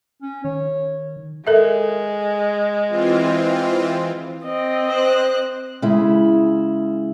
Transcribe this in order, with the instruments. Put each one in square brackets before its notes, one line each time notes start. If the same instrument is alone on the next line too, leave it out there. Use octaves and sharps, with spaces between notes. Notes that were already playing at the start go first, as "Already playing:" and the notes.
[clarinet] C#4
[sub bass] D#3 [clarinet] C#5
[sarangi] G#3 [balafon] A4 A#4 E5
[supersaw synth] E3 C4 F4
[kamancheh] C4 D#5
[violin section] C5 F#6
[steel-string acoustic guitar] C#3 G#3 E4